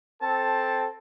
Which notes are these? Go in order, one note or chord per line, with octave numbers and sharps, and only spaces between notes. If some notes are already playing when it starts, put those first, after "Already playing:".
C4 A4 A5